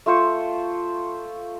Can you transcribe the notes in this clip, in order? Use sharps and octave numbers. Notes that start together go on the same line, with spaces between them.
A3 F4 C5 C#6